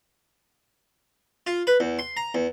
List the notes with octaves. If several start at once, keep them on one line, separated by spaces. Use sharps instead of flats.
F4
B4
E2
C6
A#5
E2